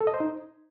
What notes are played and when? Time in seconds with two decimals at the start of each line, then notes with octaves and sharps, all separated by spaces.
0.01 A4
0.07 D#5
0.14 C5
0.20 D#4